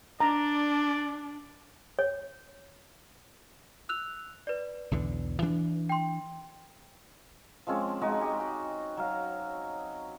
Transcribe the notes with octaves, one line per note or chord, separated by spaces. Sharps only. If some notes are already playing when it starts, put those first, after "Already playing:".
D4 D5 A#5
C#5
E6 F#6 F7
B4 D5
B1 E2 D3
E3 D4
G5 C6
F3 G#3 C4 C#4
G#3 D#4 F#4 D#5
G4 G#5
F#4
F#3 F5